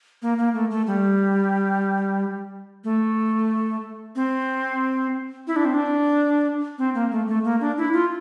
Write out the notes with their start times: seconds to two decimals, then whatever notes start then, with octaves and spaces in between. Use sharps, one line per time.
0.22 A#3
0.38 A#3
0.54 A3
0.71 A3
0.87 G3
2.84 A3
4.15 C4
5.47 E4
5.56 D4
5.65 C4
5.74 D4
6.78 C4
6.95 A#3
7.11 A3
7.28 A3
7.44 A#3
7.61 D4
7.78 E4
7.93 F4